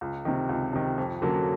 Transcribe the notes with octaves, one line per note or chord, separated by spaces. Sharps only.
C#2
C3 D#3
C#2
C3 D#3
F2
D3 F#3 A#3 C#4